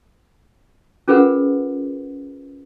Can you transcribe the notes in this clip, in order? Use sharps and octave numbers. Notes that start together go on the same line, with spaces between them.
C#4 F4 G#4 A#4 B4 F#5